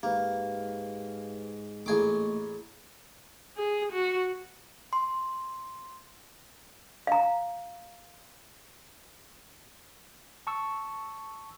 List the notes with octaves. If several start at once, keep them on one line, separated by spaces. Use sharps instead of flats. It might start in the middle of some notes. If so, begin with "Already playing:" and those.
G#2 A#3 G4 B4
A1 A3 A#3 G#4 C#6 D6
G#4
F#4
C6
F5 A#5
A5 C#6 E6